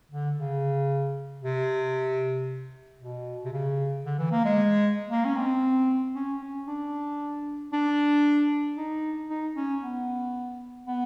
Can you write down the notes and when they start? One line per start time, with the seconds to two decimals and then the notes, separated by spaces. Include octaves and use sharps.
0.11 D3
0.39 C#3
1.43 C3
3.00 B2
3.45 C3
3.53 C#3
4.05 D3
4.19 E3
4.31 A#3
4.45 G#3
5.10 A#3
5.25 C#4
5.36 C4
6.15 C#4
6.41 C#4
6.67 D4
7.73 D4
8.77 D#4
9.30 D#4
9.56 C#4
9.82 B3
10.87 B3